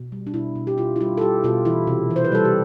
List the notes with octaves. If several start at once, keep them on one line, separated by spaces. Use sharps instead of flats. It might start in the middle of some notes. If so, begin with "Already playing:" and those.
Already playing: B2
G3
D4
B2 E4
B2
G4
B2 F4
E4
G3 F4
A4
G3 G4
B2 F4
E3 E4
C3
E3
C5
B4
G3 A4
G4